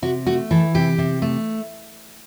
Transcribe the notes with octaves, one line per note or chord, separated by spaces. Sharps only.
C3 F#4
A3 F#4
E3 A4
C3 G4
C3
A3